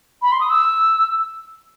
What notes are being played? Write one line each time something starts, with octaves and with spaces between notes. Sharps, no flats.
B5
C6
D#6
E6